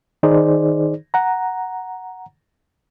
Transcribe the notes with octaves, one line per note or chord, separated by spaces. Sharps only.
D#3 D#4 G#4 C5 D5
F#5 A#5